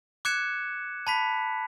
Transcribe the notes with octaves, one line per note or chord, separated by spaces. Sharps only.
D6 F#6 G#6 C#7 E7
A5 B5 B6